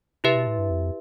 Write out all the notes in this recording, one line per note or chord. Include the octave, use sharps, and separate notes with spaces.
C3 E4 G4 B4 E5
B2
A2
G2
F2